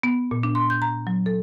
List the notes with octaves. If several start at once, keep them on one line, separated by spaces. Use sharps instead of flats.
B3
A#2
D4
C6
G6
A#5
F#3
A4